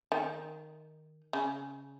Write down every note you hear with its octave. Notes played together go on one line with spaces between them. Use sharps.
D#3
C#3